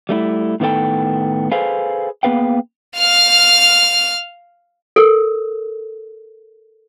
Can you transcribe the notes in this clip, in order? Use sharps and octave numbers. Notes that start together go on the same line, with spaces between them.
G3 A3 D#4 E4
A2 D#3 B3 D#4 A4 G5
G#4 A4 B4 C5 F5 G#5
A#3 B3 G#4 B4 F5 G5
F5 F6
A4 A#4